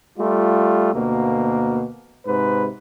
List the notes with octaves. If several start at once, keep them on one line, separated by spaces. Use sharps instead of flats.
G3 A3 F4
D2 B2 A#3
G#2 C3 G#3 B4